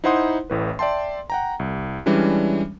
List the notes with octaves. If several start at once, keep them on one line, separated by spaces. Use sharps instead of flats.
D#4 E4 C5 F#5 C6 D#6
A1 A2 B4
D5 E5 G5 A5 C6
F#5 G5 A#5
C2
E3 G3 G#3 C#4 D4